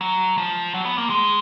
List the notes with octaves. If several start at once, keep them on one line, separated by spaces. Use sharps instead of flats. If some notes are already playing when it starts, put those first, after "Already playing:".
F#3
F3
F#3
B3
A#3
G#3